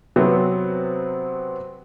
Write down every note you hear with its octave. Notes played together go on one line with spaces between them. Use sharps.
C3 F#3 B3 C4